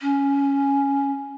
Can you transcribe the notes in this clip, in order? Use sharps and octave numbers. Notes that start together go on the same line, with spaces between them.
C#4